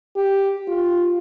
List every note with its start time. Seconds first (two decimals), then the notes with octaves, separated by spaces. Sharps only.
0.16 G4
0.68 F4